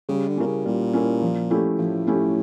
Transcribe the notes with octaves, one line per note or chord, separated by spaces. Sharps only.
C#3 G3
D3
A#2 C#4 E4 A#4
C#3
A#2 G3
C#4 E4 A#4
F3
A3 C#4 E4 G4
A2 F3
A3 C#4 E4 G4